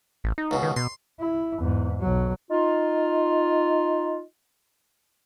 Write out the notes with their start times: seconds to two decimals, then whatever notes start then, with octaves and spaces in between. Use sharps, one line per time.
0.24 A1
0.38 D#4
0.51 C#2 B2
0.63 D#3
0.76 B2 C6
1.20 E4
1.59 E2 G#2
2.00 B1 F#3
2.51 D#4 F4